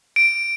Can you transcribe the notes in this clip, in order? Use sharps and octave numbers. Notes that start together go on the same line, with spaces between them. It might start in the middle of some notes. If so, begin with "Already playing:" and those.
D7